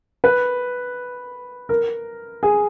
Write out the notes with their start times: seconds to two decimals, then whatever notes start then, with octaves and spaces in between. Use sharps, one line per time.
0.24 B4
1.69 A#4
2.43 G#4